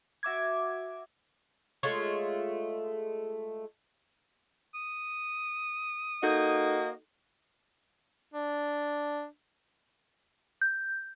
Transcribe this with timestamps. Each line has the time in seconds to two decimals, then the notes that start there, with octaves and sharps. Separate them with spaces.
0.23 F#4 E5 D6 G#6
1.83 G#3 A3 F4 C#5
4.74 D#6
6.23 A#3 D#4 F#4 A4 D#5 G6
8.34 D4
10.61 G6